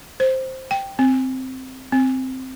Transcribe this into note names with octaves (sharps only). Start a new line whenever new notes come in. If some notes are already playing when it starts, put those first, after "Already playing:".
C5
G5
C4
C4